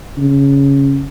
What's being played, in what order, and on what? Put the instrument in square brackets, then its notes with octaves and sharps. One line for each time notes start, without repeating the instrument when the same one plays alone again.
[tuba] C#3